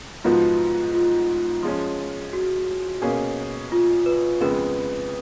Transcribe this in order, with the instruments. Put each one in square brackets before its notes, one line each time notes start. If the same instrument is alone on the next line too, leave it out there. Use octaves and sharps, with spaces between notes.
[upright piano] G#2 F3 B3 F#4 [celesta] F4
[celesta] F4
[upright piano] F3 G#3 C#4
[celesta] F#4
[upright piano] B2 A#3 C#4 G#4
[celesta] F4
B4
[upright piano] F2 C#3 G#3 B3 [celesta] B4